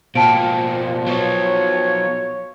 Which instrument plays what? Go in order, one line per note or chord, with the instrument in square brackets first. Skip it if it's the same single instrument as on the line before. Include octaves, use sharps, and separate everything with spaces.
[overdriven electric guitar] B2 A#3 [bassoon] F3 [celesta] G5 A5 D7
[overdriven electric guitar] F#3 B3 [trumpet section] C#5